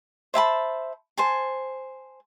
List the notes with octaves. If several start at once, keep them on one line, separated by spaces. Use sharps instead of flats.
C5 E5 A5 B5
C5 G#5 A5